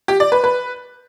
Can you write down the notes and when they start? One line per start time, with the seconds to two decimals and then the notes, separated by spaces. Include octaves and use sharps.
0.08 G4
0.20 D5
0.32 B4
0.44 B4